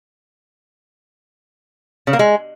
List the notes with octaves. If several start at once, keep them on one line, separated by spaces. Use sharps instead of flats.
C#3
A#3
G#3